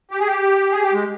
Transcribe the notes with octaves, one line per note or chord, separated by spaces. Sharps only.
G4
G#4
G4
G#4
G4
G#3